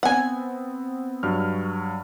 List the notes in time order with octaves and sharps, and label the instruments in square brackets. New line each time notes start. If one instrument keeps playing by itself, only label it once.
[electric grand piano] B3 C4 [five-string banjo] F#5 G#5
[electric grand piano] G2 F#3 F6